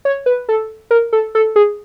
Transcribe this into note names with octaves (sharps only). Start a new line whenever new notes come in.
C#5
B4
A4
A#4
A4
A4
G#4